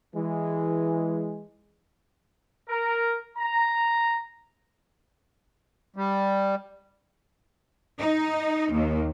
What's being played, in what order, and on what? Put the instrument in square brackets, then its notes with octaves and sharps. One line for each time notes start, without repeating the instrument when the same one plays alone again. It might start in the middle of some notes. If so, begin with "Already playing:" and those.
[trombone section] E3 G#3
[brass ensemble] A#4
A#5
[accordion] G3
[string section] D#4
D#2